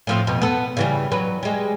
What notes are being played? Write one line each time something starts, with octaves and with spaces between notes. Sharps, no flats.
A2 F3 C4
F2 B2
B3 A4
C#3 E3 G3
F#3 B4
G3 G#3